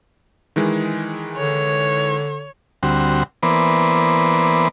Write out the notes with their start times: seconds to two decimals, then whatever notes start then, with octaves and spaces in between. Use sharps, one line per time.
0.56 D#3 E3 G#3
1.36 D3 C#5
2.83 D2 G3 C4 F#4
3.43 E3 A#3 B3 B4 C5 D5